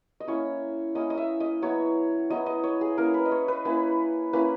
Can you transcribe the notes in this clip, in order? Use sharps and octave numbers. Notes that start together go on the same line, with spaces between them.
D#5
A#3 C#4 E4 C#5
A#3 C#4 E4 D#5
D#5
E5
D#5
F#3 B3 E4 C#5
F#3 B3 E4 D#5
D#5
C#5
G#4
A#3 C#4 E4 A#4
B4
D#5
C#5
B4
A#3 C#4 E4 B4
A#3 C#4 E4 B4